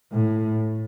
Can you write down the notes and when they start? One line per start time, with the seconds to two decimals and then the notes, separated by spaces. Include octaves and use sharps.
0.12 A2